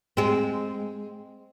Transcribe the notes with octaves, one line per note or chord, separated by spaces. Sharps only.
G#3 C4